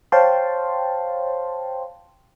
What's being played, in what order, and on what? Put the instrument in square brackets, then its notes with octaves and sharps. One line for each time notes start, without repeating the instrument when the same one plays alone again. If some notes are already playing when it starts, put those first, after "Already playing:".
[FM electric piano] C5 C#5 F5 G5 A5 C6